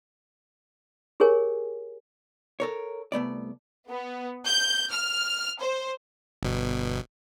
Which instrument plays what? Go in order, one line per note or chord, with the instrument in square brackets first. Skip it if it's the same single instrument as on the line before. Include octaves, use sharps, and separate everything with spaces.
[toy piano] G4 G#4 A#4 C#5 G#5
[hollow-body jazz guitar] A4 A#4 C#5
C2 A3 B3 D5
[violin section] B3
G6
F6
C5
[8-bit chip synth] G1 B2